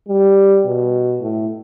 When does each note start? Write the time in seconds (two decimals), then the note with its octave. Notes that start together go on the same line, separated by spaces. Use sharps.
0.08 G3
0.65 B2
1.21 A2